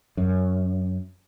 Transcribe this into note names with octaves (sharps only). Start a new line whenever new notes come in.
F#2